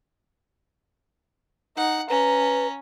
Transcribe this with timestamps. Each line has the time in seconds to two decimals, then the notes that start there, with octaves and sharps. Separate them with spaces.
1.77 D#4 F#5
2.10 C#4 B4 A#5